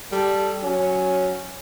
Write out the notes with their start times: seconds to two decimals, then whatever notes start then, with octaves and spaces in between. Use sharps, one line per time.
0.12 G3 A4
0.63 F#3 C#4